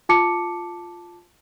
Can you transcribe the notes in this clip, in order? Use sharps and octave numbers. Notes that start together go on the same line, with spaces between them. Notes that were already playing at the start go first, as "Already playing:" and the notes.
F4 A5 D6 C#7